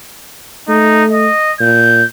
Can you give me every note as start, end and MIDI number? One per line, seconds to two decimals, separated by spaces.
0.69 1.28 57
0.69 1.04 63
1.11 1.53 75
1.60 2.02 46
1.60 2.05 91